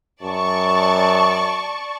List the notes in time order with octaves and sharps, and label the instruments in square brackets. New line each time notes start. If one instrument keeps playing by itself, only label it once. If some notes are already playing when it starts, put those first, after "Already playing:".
[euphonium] F#2 [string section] D5 A5 C#6